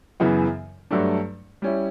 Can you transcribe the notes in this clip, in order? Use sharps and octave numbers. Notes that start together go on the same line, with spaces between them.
F#2 C#3 E3 B3
G2 F#3 A3 D4
G3 C#4 E4